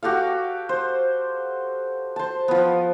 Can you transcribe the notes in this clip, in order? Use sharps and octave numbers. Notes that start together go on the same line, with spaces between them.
F#4 G4 A4 F5
C5
C5 A5
F3 B3